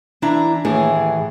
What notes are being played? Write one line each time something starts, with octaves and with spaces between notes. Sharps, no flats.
E3 D4 E4 A#5
D#2 A2 E3 G#4